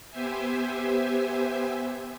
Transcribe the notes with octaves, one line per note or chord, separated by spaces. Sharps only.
B3 G4 C5 E5 G#5